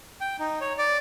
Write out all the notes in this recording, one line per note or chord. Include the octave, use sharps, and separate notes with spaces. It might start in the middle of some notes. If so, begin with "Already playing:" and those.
G5
D#4
C#5
D5